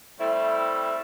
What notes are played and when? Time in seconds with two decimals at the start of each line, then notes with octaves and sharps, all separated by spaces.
0.19 G3 A3 C4 E4